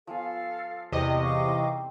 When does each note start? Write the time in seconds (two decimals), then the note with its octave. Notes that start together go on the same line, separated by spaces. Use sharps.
0.07 F3 B3 A4 F5 G#5
0.92 E2 C3 G3 A3 D#5
1.21 F5 C#6 D6
1.46 C4 D#4